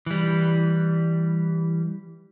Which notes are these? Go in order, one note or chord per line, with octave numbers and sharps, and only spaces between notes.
E3 G3